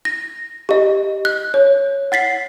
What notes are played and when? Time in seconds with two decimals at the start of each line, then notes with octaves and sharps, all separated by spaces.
0.05 A#6
0.69 G4 D#5
1.25 F#6
1.54 C#5
2.12 F#5 A6 B6 C7